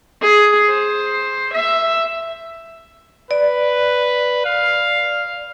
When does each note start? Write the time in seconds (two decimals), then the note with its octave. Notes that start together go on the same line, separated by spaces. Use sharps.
0.21 G#4
0.69 C5
1.52 E5
3.31 B4 D5
4.46 F5